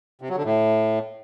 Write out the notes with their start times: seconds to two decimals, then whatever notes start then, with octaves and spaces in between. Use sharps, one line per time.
0.21 C3
0.29 F#3
0.37 D3
0.44 A2